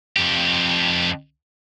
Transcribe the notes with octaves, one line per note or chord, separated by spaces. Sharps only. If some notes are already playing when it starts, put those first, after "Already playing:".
F2 G4